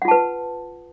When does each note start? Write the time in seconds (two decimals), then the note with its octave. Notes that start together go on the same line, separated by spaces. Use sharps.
0.02 F#5
0.05 F4
0.08 A5
0.11 B4